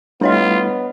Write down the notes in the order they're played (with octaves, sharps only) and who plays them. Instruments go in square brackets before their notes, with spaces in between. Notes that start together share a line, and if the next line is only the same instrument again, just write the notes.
[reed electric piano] G3 A3 E4 [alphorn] B3 [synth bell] D4 C#5 D#5 [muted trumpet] F4